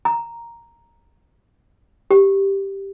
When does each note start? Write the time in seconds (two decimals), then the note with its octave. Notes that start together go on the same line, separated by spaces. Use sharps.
0.05 A#5
2.11 G4